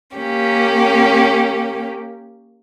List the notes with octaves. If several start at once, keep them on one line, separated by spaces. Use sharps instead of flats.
A#3 C#4 G4